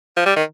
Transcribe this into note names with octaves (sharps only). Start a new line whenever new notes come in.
F3
G3
D#3